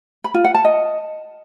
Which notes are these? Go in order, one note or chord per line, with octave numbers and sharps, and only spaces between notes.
B5
F4
F#5
A5
D#5